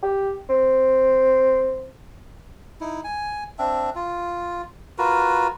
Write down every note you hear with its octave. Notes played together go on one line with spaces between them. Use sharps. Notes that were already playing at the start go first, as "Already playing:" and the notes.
G4
C4
D#4 E4
G#5
C4 D4 E5
F4
F4 F#4 A#4 B4